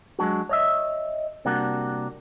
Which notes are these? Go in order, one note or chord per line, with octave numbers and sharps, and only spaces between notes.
F#3 G#3 D4 F#4
C#5 D#5 E5
C3 G3 A#3 D4 F#4